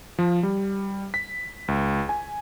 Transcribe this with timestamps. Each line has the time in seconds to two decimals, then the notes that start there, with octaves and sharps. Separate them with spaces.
0.19 F3
0.43 G3
1.14 B6
1.68 C#2
2.09 G#5